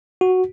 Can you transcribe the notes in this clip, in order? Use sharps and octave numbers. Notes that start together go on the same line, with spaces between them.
F#4